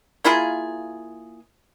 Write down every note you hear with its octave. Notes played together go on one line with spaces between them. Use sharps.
A#3 E4 F4 G#4